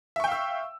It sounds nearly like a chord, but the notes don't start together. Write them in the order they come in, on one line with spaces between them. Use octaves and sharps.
E5 C#6 G5 F5 E6